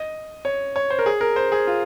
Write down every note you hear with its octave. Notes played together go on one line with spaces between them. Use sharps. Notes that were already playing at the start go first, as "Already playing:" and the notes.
Already playing: D#5
C#5
C#5
C5
A#4
G#4
A#4
C5
G#4
F4